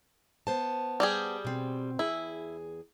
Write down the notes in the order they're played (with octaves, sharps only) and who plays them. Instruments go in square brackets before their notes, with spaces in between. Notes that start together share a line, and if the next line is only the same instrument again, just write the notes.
[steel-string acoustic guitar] B3 C5 A5
[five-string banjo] G3 G4 G#4
[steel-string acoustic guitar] B2 C4
[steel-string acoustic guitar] E2 G#4 [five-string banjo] E4